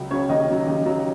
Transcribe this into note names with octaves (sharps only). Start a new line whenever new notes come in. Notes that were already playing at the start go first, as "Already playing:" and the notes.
Already playing: C#2 C#3 F#3
C#3 F#3 C#5
D#2 D#5
C#3 F#3
D#2
C#3 F#3